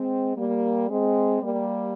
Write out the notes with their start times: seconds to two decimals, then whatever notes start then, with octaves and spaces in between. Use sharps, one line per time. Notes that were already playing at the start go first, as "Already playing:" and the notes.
Already playing: G#3 C4
0.35 G3 A#3
0.89 G#3 C4
1.42 G3 A#3